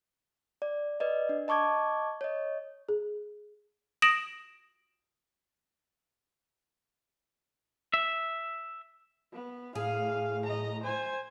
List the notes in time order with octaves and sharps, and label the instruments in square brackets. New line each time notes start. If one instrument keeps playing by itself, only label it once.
[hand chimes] D5
B4 D5 D#5
D4
D#5 A5 C#6 D6 G#6
C#5 D#5
[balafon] G#4
[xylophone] D#6 A#6 D7 E7 F#7
[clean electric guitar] E5
[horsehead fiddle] B3
[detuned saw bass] A2 [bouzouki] G#4 [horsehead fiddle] F5
[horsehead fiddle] D#5 A#5
C5 G#5